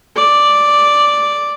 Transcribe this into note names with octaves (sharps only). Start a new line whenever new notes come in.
D5